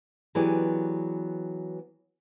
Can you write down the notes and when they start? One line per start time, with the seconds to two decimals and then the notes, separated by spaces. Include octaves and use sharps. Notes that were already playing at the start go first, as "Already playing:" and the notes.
0.35 E3 F#3 B3 G4 G#4 D5